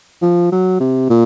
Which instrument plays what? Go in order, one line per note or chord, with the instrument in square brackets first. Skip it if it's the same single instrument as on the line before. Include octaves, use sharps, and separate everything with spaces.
[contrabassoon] F3
F#3
C3
A#2